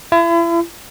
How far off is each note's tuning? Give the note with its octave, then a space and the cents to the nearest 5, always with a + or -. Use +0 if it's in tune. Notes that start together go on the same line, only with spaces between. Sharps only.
E4 +40